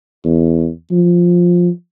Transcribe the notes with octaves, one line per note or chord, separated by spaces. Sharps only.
E2
F3